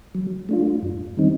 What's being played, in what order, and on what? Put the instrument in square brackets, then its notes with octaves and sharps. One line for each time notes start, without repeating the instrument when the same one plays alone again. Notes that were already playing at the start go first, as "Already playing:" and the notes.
[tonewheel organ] F#3
A3 D4 F4
F#2
D#3 G3 C4 D#4